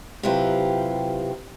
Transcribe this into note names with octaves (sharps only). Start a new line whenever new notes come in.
C3 F#3 E4 F4 G4 B4